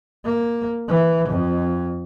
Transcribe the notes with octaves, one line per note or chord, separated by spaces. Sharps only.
A#3
E3
F2